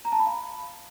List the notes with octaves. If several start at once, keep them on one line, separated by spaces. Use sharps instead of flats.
A#5
A5
B5
F5